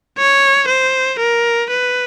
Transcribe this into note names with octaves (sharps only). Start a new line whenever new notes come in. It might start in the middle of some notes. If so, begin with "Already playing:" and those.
C#5
C5
A#4
B4